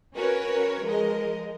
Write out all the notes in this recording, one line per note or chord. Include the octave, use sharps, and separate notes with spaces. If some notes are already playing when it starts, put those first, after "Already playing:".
C#4 F#4 A#4 B4 C#5
F3 G#3 A#4 D#5